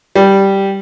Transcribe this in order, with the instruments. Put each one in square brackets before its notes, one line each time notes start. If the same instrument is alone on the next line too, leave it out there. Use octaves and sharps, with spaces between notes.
[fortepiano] G3